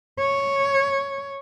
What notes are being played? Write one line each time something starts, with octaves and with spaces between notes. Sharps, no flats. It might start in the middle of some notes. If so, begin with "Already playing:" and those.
C#5